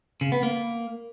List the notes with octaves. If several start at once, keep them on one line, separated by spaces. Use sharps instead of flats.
C#3
B3
A#3